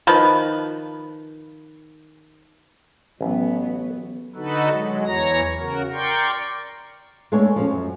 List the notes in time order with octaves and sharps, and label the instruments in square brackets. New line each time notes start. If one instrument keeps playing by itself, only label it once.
[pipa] D#3 F3 B4
[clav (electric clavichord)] A1 [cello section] F#3 B3
[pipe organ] D3 D#4 F#4 A4 B4
F#3 G#3
E2 E3 C#5 A#5 A#6
C#3 F#4 A#4
A#4 D5 G5 C6 C#6
[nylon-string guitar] G#3 A3 B3 D4 A4 C#5
F3 C#4
F#2